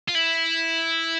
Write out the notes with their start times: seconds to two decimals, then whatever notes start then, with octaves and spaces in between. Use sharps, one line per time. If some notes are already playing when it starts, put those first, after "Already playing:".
0.08 F4
0.15 E4